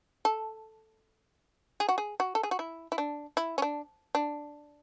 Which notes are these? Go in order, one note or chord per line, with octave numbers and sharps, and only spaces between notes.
A4
G#4
F#4
G#4
F#4
A4
G#4
F#4
E4
E4
D4
E4
C#4
D4
D4